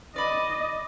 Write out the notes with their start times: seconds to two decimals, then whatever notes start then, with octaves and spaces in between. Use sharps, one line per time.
0.16 D5 D#5 B5